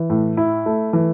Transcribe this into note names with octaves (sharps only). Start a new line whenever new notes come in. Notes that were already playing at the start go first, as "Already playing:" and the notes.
Already playing: E3
A2
E4
A3
E3